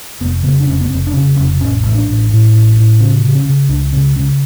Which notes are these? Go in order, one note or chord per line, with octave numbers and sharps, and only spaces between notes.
F1 B3
C#3 B3
D4
F1 C#4
B3
F1 C4
D4
C#3 C#4
F1 C#4
A1 C#4
A1
D4
A1
A2
A1
A2
C#3 C#4
C#3
C#4
C#3
C#2 D4
C#3 C#4
C#3 C#4